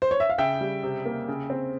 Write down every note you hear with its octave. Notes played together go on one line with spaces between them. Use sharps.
C5
C#5
E5
F5
C#3 E5 G5
G3
C3
A#3
C#3
C4